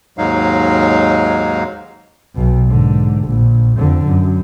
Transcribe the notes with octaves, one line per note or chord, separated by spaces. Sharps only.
D#2 G#2 F#3 G#3 D#4 F5
B1 B2
G#2 D3
A#1
F2 D3
F#2